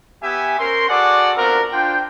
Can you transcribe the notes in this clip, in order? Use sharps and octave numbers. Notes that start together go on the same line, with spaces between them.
B3 G4 E5 G#5
C#4 A#4 C5 C6
F#4 G#4 A4 D5 F#5
B3 C4 D4 F4 F#4 A#4
D4 F4 C5 G5